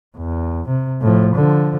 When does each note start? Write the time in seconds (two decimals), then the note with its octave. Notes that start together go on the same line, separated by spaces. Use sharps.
0.18 E2
0.69 C3
1.01 A2 F3
1.35 D3 F3